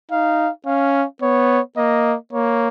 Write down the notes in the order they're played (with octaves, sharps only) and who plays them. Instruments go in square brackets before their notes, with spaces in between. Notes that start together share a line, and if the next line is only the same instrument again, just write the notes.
[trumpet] D#4 [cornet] F5
[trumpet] C#4 [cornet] F5
[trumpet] B3 [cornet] C#5
[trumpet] A#3 [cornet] D#5
[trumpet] A#3 [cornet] C#5